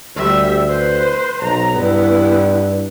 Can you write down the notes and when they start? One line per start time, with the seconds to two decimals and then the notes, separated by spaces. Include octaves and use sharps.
0.16 D2 G3 E5
0.69 B4 C5
1.42 B1 A#5
1.74 G2 B3 E4